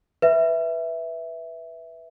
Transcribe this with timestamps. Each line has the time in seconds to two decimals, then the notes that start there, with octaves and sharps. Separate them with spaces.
0.22 B4 E5